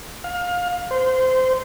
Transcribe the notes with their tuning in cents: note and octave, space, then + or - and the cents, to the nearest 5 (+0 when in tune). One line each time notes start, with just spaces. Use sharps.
F5 +25
C5 -20